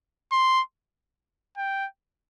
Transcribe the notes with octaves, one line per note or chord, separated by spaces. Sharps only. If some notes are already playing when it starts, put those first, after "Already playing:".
C6
G5